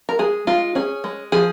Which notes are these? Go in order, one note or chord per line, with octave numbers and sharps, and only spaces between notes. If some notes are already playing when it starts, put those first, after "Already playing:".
A#4
G#3 G#4
G#3 F4
C#4 G#4
G#3
F3 G#4